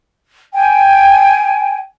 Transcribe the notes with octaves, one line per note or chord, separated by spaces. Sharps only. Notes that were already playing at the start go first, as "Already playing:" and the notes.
G5 G#5